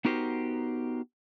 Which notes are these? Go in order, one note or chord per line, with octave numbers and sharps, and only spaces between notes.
B3 D#4 F#4 G4 A#4 C5